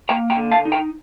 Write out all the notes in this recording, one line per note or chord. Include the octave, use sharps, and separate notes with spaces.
A#3 G5 A#5
G5 A#5
D3
F5 A5
D#4
G5 A#5